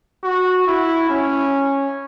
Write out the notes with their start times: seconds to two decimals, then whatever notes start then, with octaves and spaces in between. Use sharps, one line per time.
0.24 F#4
0.67 E4
1.10 C#4